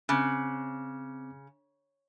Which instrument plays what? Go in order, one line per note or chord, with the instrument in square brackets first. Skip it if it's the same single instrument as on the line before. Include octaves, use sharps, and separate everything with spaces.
[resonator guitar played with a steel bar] C#3 [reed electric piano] C4 D6 F#6